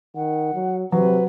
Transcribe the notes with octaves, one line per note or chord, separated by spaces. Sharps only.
D#3 F#5
F#3
C3 F#3 B4